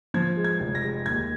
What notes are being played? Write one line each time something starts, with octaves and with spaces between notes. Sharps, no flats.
F3 G#6
G#3
G#6
F1
A#6
G#3
D#2 G#6